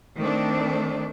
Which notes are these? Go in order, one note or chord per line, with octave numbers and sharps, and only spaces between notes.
D#3 A3 C4 D4